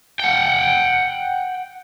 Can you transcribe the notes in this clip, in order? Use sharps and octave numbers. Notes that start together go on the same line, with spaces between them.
F#5 G5